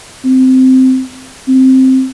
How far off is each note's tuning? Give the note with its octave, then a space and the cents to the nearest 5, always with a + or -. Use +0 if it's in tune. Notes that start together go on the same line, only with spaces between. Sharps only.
C4 -10
C4 +0